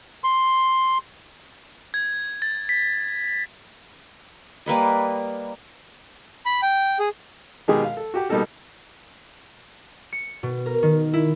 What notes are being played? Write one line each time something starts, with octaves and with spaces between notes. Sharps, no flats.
C6
G#6
A6
B6
G3 A#3 B4 D#5
B5
G5
G#4
B2 D#3 G#3 G4 G#4 A#4
F5
A4
F#4 G4 G5
B2 G3 A#3 D#4 A4 A#4
C#7
B2
A#4
D#3
E4